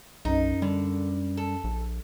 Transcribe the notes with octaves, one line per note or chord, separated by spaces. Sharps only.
B1 F#2 D#4
D3 G3
A4
A#1